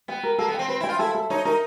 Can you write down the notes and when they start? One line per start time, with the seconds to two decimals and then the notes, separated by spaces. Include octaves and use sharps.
0.08 B3 G5
0.23 A#4
0.39 A#3 A4
0.48 B3
0.54 C4 G5
0.68 C4 B4
0.80 E4
0.84 G5
0.89 F4
0.99 E4 A4
1.15 A4
1.30 D#4 C#5
1.45 D#4 A#4